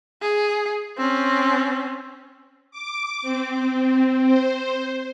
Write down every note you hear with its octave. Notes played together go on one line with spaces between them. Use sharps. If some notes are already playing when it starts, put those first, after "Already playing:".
G#4
C4 C#4
D6
C4
C5